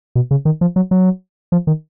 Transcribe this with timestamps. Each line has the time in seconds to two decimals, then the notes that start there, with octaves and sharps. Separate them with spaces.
0.16 B2
0.31 C#3
0.45 D#3
0.61 F3
0.76 F#3
0.91 F#3
1.52 F3
1.67 D#3